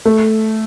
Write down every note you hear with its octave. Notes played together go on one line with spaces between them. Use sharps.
A3